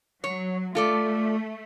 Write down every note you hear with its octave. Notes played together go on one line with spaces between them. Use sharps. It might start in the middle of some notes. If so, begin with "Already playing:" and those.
F#3 C#5
A3 F4 A4 D5